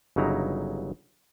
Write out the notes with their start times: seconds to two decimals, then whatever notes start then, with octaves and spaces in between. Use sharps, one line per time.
0.16 G1 C#3 F#3 D#4 E4 A#5